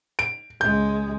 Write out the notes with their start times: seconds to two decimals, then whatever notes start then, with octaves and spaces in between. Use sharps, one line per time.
0.19 D7
0.61 C#2 G#3 G6